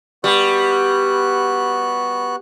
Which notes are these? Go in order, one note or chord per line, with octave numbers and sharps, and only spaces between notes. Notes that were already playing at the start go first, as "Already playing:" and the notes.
G3 B3 F#4 F#6